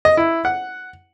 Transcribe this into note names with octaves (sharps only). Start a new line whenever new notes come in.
D#5
E4
F#5